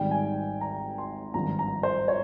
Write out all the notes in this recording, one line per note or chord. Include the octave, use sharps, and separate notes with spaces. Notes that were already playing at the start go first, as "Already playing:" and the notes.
Already playing: G#1 G#2 D#3 G3 G5
G#5
A#5
C6
G#1 G2 F3 A#5
A#5
C5
C#5